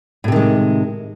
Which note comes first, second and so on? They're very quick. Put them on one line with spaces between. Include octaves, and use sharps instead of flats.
A2 C3 D#3 G#3